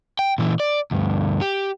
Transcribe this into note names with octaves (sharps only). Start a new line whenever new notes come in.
G5
A#2 E3
D5
D2 G2
G4